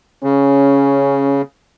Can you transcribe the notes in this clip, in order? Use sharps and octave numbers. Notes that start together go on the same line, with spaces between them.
C#3 C#4